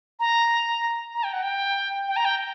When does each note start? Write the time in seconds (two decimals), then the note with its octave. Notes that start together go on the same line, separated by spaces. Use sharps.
0.20 A#5
1.15 A#5
1.24 G5
1.33 F#5
1.43 G5
2.08 G5
2.16 A#5
2.25 G5